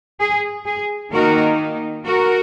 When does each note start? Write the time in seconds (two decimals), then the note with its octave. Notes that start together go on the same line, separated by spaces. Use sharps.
0.20 G#4
0.66 G#4
1.12 D#3 A#3 D#4 F#4 A#4
2.04 F#4 A#4